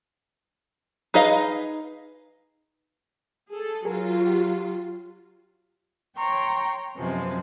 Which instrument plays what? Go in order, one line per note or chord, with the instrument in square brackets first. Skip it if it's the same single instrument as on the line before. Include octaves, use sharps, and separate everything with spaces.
[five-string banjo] D#4 G#4 B4 D#5 F5
[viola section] G#4 A4
[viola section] F#3 F4 [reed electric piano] G#4 A#4
[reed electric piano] G4
[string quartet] C#5 G5 A#5 C6 C#6
F#2 C3 F3 G#3 B3